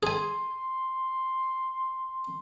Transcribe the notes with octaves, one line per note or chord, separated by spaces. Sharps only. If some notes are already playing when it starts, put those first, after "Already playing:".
G#4 G#5 C6